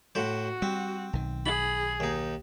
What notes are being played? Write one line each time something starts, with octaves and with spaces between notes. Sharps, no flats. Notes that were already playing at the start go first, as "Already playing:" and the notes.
A2 F#4 C5
G3 C4
B1 D#3
G#4 B5
D#2 D#4